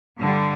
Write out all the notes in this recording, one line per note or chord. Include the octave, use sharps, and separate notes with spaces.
G2 D3 G3